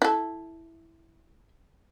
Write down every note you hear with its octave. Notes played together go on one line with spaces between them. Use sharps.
E4 A4